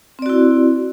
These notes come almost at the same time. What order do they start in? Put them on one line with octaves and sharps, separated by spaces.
C4 D5 F#4 E4